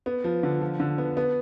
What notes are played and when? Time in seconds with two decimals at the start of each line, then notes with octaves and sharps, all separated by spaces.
0.06 B3
0.24 F3
0.43 D3
0.61 F3
0.80 D3
0.98 B3
1.17 B3